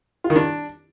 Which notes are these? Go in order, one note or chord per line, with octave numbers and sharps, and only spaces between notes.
F4
D#3
D4